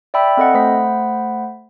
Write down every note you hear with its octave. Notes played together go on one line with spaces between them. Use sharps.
D5 E5 G5 B5 E6
C4 A4 D#5 F#5
A3 C5 F#5 B5 B6